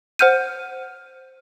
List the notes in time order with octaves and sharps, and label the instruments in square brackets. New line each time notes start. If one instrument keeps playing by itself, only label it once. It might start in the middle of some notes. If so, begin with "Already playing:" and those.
[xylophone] C5 F#5 F6 G6 D#7